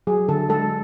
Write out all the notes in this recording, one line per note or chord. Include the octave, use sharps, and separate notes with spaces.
F#3 G#4
D3 A4
G#3 A4